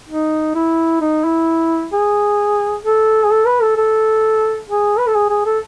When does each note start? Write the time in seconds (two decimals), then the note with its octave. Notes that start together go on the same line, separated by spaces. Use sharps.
0.09 D#4
0.55 E4
1.01 D#4
1.24 E4
1.93 G#4
2.85 A4
3.24 G#4
3.31 A4
3.46 B4
3.62 A4
3.77 A4
4.68 G#4
4.99 B4
5.07 A4
5.15 G#4
5.30 G#4
5.46 A4